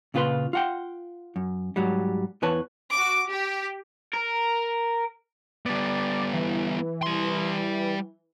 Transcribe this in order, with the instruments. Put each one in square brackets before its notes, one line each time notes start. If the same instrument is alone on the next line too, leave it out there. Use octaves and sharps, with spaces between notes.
[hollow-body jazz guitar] A#2 C#3 F4 G4 B4 C6
F4 F#5 G5
F#2
G#2 F#3 G3
E2 E3 B4 C#5 A5
[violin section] F#4 D6
G4
[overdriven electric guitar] A#4
[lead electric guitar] G3 B3 [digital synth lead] D5
[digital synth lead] E3
[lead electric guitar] G3 C6